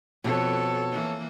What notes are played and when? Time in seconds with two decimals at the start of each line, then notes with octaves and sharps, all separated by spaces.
0.24 F2 B2 A4 C#5
0.92 E3 A#3